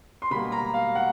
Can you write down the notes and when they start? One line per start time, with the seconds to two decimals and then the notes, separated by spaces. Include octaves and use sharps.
0.22 C6
0.30 B2 G3 A#3 B5
0.52 A#5
0.74 F5
0.95 F#5